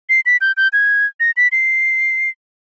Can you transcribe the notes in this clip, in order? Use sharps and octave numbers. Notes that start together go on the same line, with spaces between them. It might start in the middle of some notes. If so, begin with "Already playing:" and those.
C7
B6
G6
G6
G#6
A#6
B6
C7